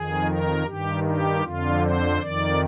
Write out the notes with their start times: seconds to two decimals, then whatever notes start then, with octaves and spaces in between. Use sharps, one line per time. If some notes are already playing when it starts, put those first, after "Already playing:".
Already playing: F2 D#3 G#4
0.26 A#4
0.64 G2 D#3 G4
1.03 G4
1.42 F2 D3 F4
1.81 C5
2.20 F2 D#3 D5